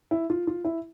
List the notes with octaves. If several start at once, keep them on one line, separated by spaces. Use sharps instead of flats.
E4
F4
F4
E4